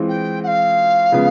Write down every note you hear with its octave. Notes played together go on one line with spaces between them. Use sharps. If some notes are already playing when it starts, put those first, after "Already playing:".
Already playing: E3 G#3 C4 F4
G5
F#5
F5
C#3 F3 G#3 B3